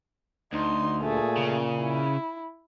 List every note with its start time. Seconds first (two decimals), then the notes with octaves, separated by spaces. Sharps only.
0.53 D2 D#4 C6
1.02 A#2 A3 G#4
1.37 C#3
1.79 E4